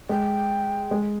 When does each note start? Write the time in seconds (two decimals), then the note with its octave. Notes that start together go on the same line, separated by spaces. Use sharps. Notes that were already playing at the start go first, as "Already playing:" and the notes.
0.09 G#3 G5
0.91 G#3